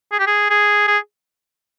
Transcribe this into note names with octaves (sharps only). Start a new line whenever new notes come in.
G#4
G4
G#4
G#4
G#4